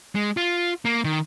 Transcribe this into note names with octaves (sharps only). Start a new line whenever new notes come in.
G#3
F4
A#3
D#3